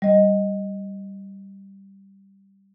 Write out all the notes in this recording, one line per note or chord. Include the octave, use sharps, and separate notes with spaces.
G3 D#5